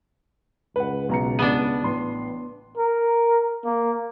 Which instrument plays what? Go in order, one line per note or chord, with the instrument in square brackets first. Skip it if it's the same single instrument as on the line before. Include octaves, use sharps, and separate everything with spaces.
[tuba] C#2 [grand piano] B4 F#5
[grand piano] B1 A#5 C#7
[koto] B3 D4 [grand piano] D#7
[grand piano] A1 C6
[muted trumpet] A#4
A#3